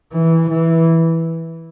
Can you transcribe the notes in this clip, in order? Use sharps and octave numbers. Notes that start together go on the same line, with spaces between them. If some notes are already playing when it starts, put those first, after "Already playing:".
E3
E3